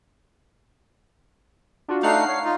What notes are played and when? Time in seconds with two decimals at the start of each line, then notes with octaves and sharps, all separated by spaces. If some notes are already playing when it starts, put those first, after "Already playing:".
1.88 D4 F4 F#4
2.03 A3 D4 D#4 F5 F#5 C7
2.28 C#5
2.44 D#4 F4